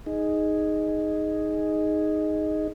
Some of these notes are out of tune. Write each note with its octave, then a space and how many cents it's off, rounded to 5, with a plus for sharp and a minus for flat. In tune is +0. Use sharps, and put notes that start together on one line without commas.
D#4 +0 G#4 +0